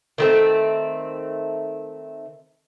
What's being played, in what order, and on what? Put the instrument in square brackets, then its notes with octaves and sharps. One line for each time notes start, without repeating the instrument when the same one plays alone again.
[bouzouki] D#3 A3 C4